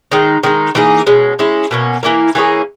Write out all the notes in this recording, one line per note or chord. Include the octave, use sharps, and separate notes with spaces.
D#3 G#3 D#4
D#3 G#3 D#4
E3 A#3 D#4 G#4
B2 G#3 C#4
G#3 C#4 E4
B2 A#3 C#4
E3 A#3 E4 A#4
E3 A#3 C#4 G#4